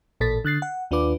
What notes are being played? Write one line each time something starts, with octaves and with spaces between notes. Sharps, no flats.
A1 A#2 A4 A6 B6
D3 F#6 A6 C7
F#5
D#2 D4 F4 B4 D6